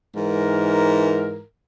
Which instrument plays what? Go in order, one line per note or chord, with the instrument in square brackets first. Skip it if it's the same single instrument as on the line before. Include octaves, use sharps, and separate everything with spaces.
[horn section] G#2 E3 A#4